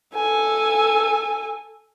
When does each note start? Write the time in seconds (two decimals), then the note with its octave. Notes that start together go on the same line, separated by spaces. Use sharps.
0.15 A4 G#5